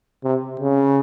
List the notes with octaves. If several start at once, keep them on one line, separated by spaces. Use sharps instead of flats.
C3
C#3